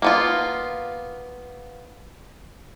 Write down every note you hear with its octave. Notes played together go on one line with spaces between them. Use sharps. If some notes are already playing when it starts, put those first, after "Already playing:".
A#3 B3 F4